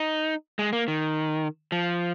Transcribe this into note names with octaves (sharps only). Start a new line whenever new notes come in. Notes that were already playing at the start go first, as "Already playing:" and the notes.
Already playing: D#4
G#3
A#3
D#3
F3